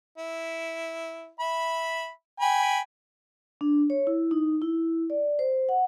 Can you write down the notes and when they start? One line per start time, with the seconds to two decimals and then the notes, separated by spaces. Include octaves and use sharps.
0.18 E4
1.40 E5 B5
2.40 G5 G#5 B5
3.61 D4
3.90 C#5
4.07 E4
4.31 D#4
4.62 E4
5.10 D5
5.39 C5
5.69 F#5